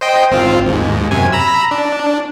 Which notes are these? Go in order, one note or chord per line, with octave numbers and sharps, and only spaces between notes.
C5 D#5 G5
G#1 C4 F4
D#2 G#2
F#2 C3 G#5
A#5 B5 E6
D4